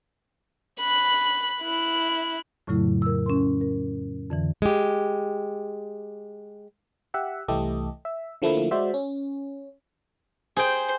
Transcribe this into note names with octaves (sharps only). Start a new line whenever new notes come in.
B5 F#6
E4 F#6
F2 A2 C#3 F#3 A3 E4
A#4 E6
C#4 A#4 C6
A#4
F2 D3 E3
G#3 G4
G4 E5 F#5
C2 E3 A3 G4 A4 D#5
E5
D3 F3 A3 A#3 E4
G#3 F#4 C5 D5 E5
C#4
G#4 C5 G5